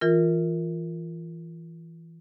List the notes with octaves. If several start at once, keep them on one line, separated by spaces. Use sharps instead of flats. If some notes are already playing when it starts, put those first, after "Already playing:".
E3 F4 A#4